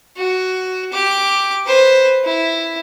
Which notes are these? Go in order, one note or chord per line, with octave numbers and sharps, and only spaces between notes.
F#4
G4 D6
B4 C5
E4